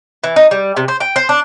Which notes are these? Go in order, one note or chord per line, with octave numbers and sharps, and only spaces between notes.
E3
D#4
G3
C3
C5
G5
C5
D4